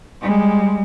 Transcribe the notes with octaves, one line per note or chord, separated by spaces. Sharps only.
G3 G#3